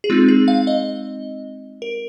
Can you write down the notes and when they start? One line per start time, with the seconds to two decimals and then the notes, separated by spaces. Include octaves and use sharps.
0.04 G#4
0.10 G#3 C4 D#4 F4
0.28 G#4
0.48 F5
0.67 D#5
1.82 A#4